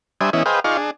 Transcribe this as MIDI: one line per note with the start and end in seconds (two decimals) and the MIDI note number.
0.21 0.30 55
0.21 0.30 62
0.21 0.30 72
0.21 0.30 76
0.21 0.30 80
0.21 0.30 87
0.33 0.43 52
0.33 0.43 59
0.33 0.43 61
0.33 0.43 64
0.33 0.43 75
0.46 0.60 68
0.46 0.60 71
0.46 0.60 72
0.46 0.60 75
0.46 0.60 77
0.46 0.60 79
0.64 0.77 63
0.64 0.77 65
0.64 0.77 68
0.64 0.77 74
0.64 0.77 77
0.64 0.77 85
0.77 0.91 62
0.77 0.91 68